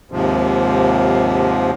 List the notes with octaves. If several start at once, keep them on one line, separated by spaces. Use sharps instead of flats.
D#2 G#2 C3 F3